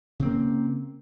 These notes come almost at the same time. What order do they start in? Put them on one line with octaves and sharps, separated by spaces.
C#3 C4 A#3